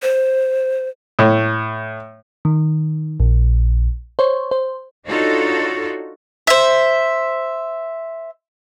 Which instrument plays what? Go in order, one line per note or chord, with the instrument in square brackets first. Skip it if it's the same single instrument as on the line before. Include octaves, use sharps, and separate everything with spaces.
[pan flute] C5
[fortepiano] A2
[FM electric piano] D#3
A#1
C5 C#5
C5
[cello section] D4 D#4 F4 F#4 A4 C#5
[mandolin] C5 E5